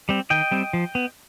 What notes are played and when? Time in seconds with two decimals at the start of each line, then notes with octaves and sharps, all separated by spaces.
0.09 G3 C4
0.30 D#3 D#5 G5
0.51 G3 C4
0.73 F3
0.95 B3